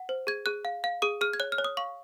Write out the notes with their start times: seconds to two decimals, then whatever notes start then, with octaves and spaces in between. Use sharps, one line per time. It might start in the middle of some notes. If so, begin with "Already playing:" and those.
Already playing: F#5
0.09 C5
0.27 G#4 G#6
0.46 G#4 F#6
0.65 F5
0.84 F5
1.02 G#4 D#6
1.21 G#4 F6
1.33 G#6
1.40 C#5 F#6
1.52 F6
1.58 C#5
1.64 D#6
1.77 F5 C#6